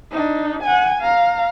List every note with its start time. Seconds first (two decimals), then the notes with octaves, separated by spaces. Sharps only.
0.11 D4 D#4
0.63 F#5 G#5
1.01 F5 A#5